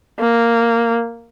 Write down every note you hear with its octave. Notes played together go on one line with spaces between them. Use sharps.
A#3